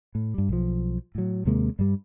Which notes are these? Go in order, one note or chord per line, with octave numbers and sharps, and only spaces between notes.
A2
G2 G3
B1 F3
A2 F#3
D#2 C3 G#3 A#3
G2 G3